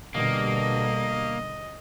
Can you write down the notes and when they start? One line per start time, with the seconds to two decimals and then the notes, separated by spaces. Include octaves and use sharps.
0.14 B2 D3 G3 A#3 D#5